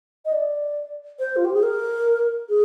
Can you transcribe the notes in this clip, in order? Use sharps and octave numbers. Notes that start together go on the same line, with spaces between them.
D#5
D5
C5
F4
G4
G#4
A#4
G#4